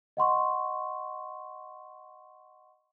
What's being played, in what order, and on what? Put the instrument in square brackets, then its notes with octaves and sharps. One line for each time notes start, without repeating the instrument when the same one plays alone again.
[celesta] D#5 F#5 C6 C#6